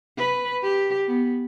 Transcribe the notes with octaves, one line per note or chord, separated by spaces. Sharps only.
B4
G4
B3